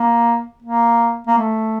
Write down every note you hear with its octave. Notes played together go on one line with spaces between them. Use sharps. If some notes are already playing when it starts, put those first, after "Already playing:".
Already playing: A#3
A#3
A#3
A3